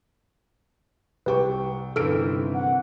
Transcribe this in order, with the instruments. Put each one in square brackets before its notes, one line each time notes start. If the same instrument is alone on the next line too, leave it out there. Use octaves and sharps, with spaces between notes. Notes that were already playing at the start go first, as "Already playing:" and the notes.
[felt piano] C2 G5 C#6 [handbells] G4 B4
[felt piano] G1 [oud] C3 D#3 E3 [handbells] A4 F6 D7
[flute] F#5